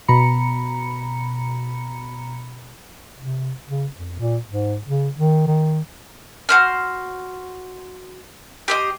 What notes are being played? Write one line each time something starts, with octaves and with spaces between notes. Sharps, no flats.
B2 A#5 B5 C#7
C3
C#3
F2
A#2
G#2
C#3
D#3
D#3
F#4 C5 F6
G4 C5 D#5